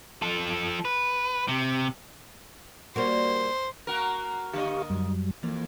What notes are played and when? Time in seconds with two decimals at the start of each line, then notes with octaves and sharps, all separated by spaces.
0.22 F3 A4
0.85 B4
1.48 C3
2.96 G3 A#3 F#4 C5
3.87 A#3 F#4 A#4
4.53 D3 A#3 G4 D#5 F5 C#6
4.90 F#2 F#3 G3
5.43 F2 E3 A#3